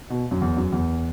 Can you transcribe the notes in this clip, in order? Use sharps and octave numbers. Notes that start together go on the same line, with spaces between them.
B2
F#2
E2
F#2
E2